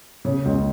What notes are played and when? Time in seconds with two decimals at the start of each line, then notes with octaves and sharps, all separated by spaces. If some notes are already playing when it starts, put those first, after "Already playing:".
0.25 C#3
0.45 C#2